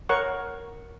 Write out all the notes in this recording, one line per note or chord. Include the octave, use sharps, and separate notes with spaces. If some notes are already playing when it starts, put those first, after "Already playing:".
A#4 C#5 F#5 C#6